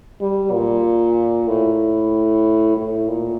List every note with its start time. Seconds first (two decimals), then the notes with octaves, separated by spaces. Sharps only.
0.21 G3
0.52 A#2
1.48 A2
2.77 A2
3.08 A#2